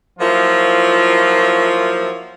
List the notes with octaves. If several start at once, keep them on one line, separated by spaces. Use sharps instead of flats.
F3 F#3 A#3 E4 F4